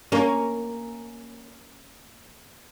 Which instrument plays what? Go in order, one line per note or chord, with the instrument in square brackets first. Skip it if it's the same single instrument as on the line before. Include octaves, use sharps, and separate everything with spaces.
[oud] A#3 C#4